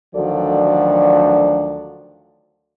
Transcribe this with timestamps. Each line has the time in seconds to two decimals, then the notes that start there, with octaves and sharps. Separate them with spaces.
0.15 D2 D#3 F3 F#3 A4 D5